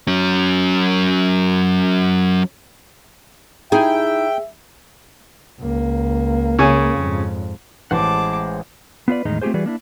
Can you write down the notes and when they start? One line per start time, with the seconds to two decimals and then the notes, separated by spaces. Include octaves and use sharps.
0.07 F#3 C#4
3.72 D#4 E4 G#4 E5 G5
5.60 C#2 A#3
6.59 C#3 C#5 G#5
6.96 F2 G#2
7.91 A1 G#3 C5 F#5 A5 D6
9.08 B3 F4 B4 D5
9.25 E2 A2 D#3 G#3 D#4
9.42 A3 C4 F4 G4 G#4 C5
9.54 E3 G3 F#4 G#4 B4 D5
9.66 A#3 D4 E4